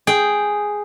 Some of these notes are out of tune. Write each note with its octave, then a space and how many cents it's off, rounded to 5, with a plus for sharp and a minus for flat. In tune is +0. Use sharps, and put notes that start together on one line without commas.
G#4 +0 G5 +0